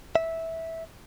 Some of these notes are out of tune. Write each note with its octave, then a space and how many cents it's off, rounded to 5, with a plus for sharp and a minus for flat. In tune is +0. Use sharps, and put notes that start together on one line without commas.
E5 -10